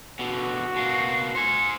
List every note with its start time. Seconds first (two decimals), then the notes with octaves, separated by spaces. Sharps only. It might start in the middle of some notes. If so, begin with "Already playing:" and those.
0.19 B2 D3 F#4
0.76 B2 A#3 C7
1.35 C5 G#5 C#7